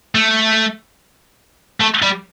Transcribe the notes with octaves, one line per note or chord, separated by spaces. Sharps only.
A3
A3
G3